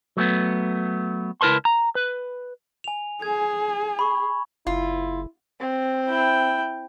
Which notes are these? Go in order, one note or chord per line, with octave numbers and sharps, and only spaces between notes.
F#3 A3 B3
C#2 E4 A#4 B4 A5 C6
A#5
B4
G#5 F7
G#4 G#6
B5 C#6
F#1 E4 F4
C4
E4 G5